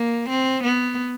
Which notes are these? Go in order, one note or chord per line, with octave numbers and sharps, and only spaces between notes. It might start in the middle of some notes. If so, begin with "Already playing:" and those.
Already playing: A#3
C4
B3